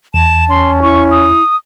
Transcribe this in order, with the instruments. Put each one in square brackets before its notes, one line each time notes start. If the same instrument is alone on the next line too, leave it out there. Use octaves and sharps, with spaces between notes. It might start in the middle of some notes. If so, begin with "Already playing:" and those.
[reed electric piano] E2 [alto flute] A5 [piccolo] E7
[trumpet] C#4 [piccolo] C6
[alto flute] E4 [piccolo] C#6
[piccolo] D#6